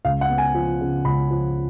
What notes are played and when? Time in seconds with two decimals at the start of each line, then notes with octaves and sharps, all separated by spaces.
0.05 C#2 F5
0.21 F#5
0.30 B3
0.38 G#5
0.55 F3
0.81 C#3
1.05 C#2 B5
1.31 F3